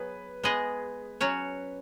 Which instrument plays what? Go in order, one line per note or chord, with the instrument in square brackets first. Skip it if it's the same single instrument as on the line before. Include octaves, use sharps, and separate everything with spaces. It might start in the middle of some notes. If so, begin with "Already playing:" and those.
Already playing: [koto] F#3 B3 G#4 [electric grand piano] B4
[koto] G#3 B3 G#4 D#5
F#3 C#4 F#4 C#5